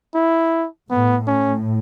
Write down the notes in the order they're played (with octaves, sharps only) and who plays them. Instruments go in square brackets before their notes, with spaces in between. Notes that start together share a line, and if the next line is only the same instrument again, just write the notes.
[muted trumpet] E4
[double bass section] A2 [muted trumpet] B3
[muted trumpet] C#4